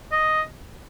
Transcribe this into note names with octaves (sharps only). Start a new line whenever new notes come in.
D#5